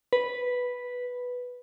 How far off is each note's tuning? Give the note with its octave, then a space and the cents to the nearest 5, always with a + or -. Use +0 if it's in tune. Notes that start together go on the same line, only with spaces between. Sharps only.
B4 -5